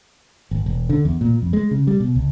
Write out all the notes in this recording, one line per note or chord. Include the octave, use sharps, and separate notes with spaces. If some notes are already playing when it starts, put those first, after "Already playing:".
G#1
E1
D3
E2
A#2
F2
G#3
C#3
G3
B2
C#2